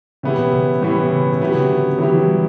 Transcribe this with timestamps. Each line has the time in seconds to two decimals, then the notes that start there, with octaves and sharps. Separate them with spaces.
0.23 A2 C#3 E3 B3 E4 G4
0.38 B2
0.53 C#3
0.81 A2 E3 G3 B3 E4 G4
0.96 B2
1.11 C#3
1.26 C#3
1.41 F#3 B3 E4 G4
1.55 C#3
1.70 D3
1.98 E3 F#3 B3 E4 G4
2.14 E3
2.28 G3